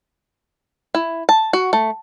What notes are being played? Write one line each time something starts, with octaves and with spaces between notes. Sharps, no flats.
E4
A5
F#4
A3